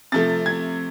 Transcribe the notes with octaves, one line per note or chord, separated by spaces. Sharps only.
C3 F3 A3 A6
G#6